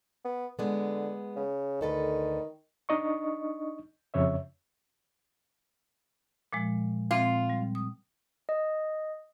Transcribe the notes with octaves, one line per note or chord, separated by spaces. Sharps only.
B3
D3 G#3 B3
C#3
D2 D#3 A4 B4
D4 D#4 D#5 C#6
F2 C#3 C#5 E5
A#2 F3 G#3
A#2 C4 F4
G3
D#6
D#5